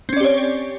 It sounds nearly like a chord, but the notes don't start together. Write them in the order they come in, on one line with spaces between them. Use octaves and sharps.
C4 C#4 D5 G4 C#5